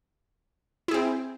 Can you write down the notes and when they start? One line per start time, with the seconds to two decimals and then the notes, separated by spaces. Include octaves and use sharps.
0.88 E4
0.91 G#4
0.94 C4